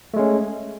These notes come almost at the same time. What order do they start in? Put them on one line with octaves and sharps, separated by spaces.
A3 G#3 C#4